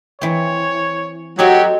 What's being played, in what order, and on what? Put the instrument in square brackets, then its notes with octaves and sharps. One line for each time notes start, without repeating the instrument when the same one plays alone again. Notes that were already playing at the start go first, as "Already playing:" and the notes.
[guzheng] E3 C4 [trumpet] C#5
[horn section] F#3 [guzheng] C4 D#4 A4 [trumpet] G4